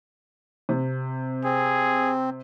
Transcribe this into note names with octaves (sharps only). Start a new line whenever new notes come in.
C3
C4 G#4